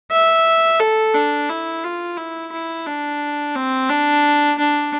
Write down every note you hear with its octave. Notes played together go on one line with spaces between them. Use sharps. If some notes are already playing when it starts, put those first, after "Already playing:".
E5
A4
D4
E4
F4
E4
E4
D4
C4
D4
D4